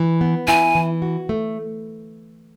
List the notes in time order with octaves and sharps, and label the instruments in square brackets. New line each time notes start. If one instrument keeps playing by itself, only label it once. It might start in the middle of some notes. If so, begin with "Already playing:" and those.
Already playing: [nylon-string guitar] E3
B3
[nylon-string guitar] E4 [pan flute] G#5
[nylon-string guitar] E3
F#4
A3